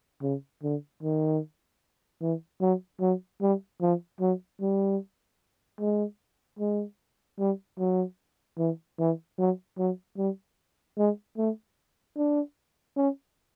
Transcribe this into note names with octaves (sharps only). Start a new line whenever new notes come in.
C#3
D3
D#3
E3
F#3
F#3
G3
F3
F#3
G3
G#3
G#3
G3
F#3
E3
E3
F#3
F#3
G3
G#3
A3
D4
C#4